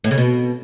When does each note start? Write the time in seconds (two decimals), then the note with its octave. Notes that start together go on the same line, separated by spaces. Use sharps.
0.04 A2
0.11 C#3
0.18 B2